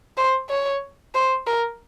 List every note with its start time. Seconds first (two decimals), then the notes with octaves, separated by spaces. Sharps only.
0.17 C5
0.50 C#5
1.14 C5
1.47 A#4